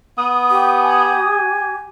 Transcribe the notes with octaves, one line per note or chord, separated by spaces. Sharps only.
B3 D#6
G4
G#5